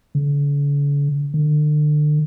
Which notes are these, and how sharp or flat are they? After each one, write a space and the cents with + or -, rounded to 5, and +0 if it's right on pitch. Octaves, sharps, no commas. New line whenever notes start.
D3 -45
D3 +35